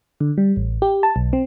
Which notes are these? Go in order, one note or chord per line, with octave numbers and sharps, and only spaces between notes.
D3
G3
A1
G4
A5
B1
C4